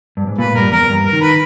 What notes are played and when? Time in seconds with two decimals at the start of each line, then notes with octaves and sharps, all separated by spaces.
0.17 G2
0.27 G#2
0.38 A#2 B4
0.55 G2 A#4
0.72 E2 A#4
0.89 G2
1.05 A#4
1.13 D#3
1.21 B4